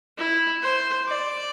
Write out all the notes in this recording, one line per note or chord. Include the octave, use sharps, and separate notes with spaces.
E4
C5
D5